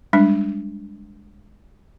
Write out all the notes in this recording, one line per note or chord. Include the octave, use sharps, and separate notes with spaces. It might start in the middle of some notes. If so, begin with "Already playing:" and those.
G3 G#3 D4